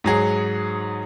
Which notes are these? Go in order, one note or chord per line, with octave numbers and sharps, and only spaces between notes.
G#2 F#3 G#4